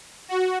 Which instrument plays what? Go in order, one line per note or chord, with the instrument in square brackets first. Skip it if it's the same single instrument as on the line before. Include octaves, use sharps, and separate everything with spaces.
[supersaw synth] F#4